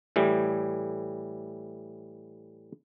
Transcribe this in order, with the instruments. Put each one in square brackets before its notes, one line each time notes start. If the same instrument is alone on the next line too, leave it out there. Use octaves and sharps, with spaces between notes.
[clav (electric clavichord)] A2 E3 G3